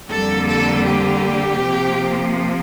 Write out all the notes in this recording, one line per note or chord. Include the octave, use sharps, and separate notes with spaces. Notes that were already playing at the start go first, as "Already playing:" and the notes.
F2 D3 G3 A#3 A4
A4
G4
C3 F3 A#3